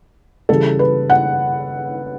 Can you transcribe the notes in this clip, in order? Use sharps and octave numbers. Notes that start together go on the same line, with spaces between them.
C#3 E3 G3 A4
B4
F#5